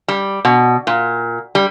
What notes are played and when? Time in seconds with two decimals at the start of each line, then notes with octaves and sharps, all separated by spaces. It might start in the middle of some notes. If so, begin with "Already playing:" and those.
0.08 G3
0.45 B2
0.87 A#2
1.55 G3